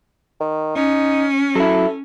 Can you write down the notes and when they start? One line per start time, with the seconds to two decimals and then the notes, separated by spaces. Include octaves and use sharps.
0.40 D#3
0.76 C#4 D#4
1.55 F#3 E4 A4